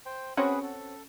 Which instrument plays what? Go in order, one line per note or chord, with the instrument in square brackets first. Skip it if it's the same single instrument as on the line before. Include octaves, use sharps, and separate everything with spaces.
[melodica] C5 G5
[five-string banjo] C4 F#4 C#5 [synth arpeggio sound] C#4 F#5 [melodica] G#4 B4
[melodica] A4